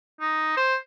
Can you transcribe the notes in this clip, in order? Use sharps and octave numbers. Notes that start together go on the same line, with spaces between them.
D#4
C5